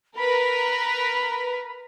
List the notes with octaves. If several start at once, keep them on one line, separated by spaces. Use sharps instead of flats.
A#4 B4 B5